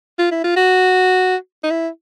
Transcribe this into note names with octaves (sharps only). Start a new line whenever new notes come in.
F4
E4
F4
F#4
D#4
E4